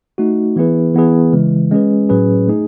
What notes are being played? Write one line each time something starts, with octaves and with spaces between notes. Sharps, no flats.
A3 D#4 F#4
E3 B3 E4 G#4 B4
E3 B3 E4 G#4 B4
C#3 E3 G#3
G#3 C#4 G#4 B4
A2 F#3 C#4 G#4 B4
A3 D#4 G#4